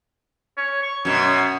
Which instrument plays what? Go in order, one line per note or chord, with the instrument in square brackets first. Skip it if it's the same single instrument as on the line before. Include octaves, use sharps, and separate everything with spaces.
[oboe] C#5
C#6
[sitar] F#2 B2 [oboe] C#5